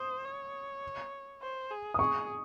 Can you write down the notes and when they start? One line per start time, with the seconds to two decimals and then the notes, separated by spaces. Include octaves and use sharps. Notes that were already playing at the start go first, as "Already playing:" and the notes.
Already playing: C5 D#6
0.25 C#5
1.42 C5
1.71 G#4
1.94 D#6
1.99 G#4 C#6